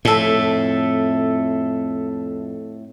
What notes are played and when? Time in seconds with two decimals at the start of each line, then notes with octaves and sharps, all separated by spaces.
0.05 F2 A2 A4 E5